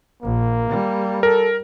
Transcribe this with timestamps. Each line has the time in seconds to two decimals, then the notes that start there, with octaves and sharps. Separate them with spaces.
0.23 A#1 A#3
0.69 G3
1.23 A4 A#4